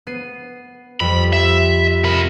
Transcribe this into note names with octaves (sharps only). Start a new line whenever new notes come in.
B3 C7 D#7
F2 G3 B5
E5
C3 A#4 B5